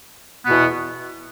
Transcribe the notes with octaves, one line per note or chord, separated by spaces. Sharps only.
E2 B2 B3